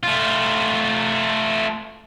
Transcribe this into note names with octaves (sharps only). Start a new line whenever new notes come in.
A3 F4